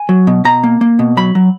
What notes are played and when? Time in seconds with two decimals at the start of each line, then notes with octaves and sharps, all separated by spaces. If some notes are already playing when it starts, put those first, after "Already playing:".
Already playing: G#5
0.09 F#3
0.27 B2
0.45 B2 A#5
0.64 A#3
0.81 A#3
0.99 B2
1.17 F#3 B5
1.35 F#3